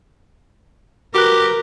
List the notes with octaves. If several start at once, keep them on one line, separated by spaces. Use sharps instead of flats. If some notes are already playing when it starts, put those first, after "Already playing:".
F#4 G4 A#4 B4 F#6